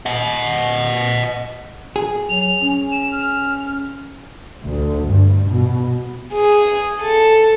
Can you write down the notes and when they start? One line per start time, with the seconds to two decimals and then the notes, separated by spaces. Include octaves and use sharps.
0.06 D#5 F#5
1.96 G#4
2.29 F#3 F7
2.61 C#4
2.92 E7
3.12 F6
4.65 D2
5.06 G2
5.50 B2
6.33 G#4
7.02 A4